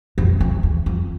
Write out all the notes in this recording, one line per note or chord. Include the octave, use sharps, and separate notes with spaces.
F2
F2
E2
F2